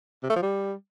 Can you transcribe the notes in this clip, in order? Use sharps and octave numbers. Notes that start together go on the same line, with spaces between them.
C3
A3
F3
G3